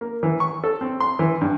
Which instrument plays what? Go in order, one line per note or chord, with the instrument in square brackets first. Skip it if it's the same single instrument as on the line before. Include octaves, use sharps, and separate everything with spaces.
[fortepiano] A#3
E3
C#6
A4
C4
C6
E3
G2